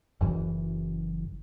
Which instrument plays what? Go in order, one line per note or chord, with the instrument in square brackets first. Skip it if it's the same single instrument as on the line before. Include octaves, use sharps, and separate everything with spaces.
[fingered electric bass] F#1 F#2 E3